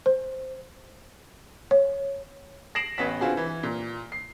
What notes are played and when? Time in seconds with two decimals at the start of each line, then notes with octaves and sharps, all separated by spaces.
0.06 C5
1.71 C#5
2.75 A#6 C7 D7 E7 F#7
2.98 A1 B3 C#4 B6
3.21 D3 C4 F4 F#4 G#4
3.37 E3
3.63 A#2
4.12 C7